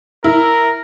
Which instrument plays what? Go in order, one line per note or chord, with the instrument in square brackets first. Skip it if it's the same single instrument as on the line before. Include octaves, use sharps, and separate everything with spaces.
[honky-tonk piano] E4 [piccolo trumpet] A#4